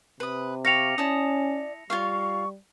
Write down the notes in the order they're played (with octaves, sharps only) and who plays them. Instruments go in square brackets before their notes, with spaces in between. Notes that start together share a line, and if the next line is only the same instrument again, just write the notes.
[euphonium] C3 [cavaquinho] B4 D#6
[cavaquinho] G4 F5 [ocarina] C#6 [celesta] A#6 C#7 F7
[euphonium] C#4 [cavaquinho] E4 A5 D#6 [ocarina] D5
[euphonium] G3 [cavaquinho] F4 C#5 F5 [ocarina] C#6